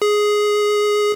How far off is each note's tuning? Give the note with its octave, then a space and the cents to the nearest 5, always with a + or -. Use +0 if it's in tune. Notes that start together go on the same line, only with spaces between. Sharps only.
G#4 +5